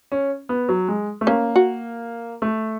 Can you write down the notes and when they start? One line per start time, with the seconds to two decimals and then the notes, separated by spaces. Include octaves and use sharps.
0.12 C#4
0.49 B3
0.69 F#3
0.88 G#3
1.21 A3
1.27 A#3 C#4
1.56 F#4
2.42 A3